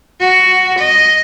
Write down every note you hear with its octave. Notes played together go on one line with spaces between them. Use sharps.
F#4
D#5